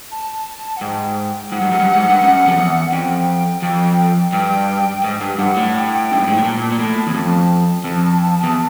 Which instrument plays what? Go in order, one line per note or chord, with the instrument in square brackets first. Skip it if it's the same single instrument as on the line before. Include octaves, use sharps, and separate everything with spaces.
[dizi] A5
F#5
[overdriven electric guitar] G#2 [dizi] G5
[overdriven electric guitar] G#2 [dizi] F#5
[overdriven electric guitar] G2
F#2
G2
G#2
G2
F#2
F2
E2
[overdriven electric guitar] F2 [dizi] G5
[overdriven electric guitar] F2 [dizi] G5
[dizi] G5
[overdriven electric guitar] G2 [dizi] G5
[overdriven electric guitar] G#2
G2
[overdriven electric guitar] G2 [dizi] F#5
[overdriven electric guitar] A2
[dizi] G5
[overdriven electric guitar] F#2
G2
G#2
A2
[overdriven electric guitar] A#2 [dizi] A5
[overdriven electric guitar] A#2
A2
E2
[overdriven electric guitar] F2 [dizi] A5
[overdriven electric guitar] F2
E2